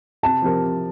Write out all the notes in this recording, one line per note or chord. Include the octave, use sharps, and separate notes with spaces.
C3 A5
F3 C4 G4 A#4
C3